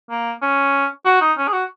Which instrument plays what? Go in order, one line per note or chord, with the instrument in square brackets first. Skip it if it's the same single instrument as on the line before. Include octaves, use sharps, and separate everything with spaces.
[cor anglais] A#3
C#4
F#4
D#4
C#4
G#4
F#4